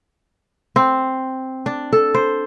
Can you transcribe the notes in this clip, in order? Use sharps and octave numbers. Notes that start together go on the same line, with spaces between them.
C4
D4
A4
C5